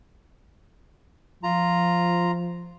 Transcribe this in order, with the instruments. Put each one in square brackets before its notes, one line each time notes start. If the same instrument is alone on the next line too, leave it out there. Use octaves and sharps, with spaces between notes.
[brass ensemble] F3 [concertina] F4 A#5